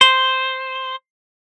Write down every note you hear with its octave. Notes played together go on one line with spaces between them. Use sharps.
C5